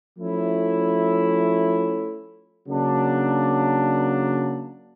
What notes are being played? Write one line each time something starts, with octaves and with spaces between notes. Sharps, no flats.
F3 A3 C#4 E4
C#3 F#3 A#3 D4